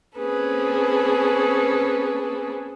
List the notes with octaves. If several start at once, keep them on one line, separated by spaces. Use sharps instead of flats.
A#3 C4 C#4 G#4 A4 B4